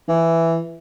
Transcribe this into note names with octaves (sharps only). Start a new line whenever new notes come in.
E3